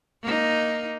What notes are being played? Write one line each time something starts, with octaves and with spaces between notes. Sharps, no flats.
A#3 D#4